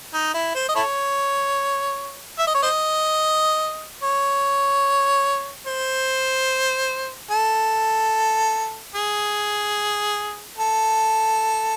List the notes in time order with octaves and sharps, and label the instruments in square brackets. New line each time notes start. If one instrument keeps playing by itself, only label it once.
[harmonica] D#4
E4
C5
D#5
E4 A4 C#5
E5
D#5
C#5
C5 D#5
C#5
C5
A4
G#4
A4